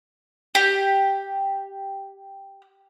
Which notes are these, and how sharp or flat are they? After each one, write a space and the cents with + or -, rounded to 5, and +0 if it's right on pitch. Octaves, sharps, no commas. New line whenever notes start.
G4 +0